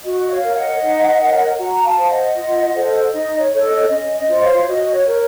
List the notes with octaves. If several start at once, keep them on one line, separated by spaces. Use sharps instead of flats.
F#4 D#5
C#5 F5
A#4 C#5
D#5 F#5
D#4
A#4 C#5
F#4 F#5 A#5
F5 A5
C5
D#5 F#5
F4
A4 C5
D#4 D#5
C#5
A4 C#5
D#5
C#4 D#5
D#5
F4 C5
C#5 F5
F#4 D#5
C#5
A#4 C#5